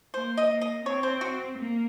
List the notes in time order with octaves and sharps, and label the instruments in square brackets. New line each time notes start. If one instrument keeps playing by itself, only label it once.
[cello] A#3 [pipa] C5
[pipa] D#5
[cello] A#3
[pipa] D#5
[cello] C4 [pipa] C#5
[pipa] C5
F#4
[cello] A#3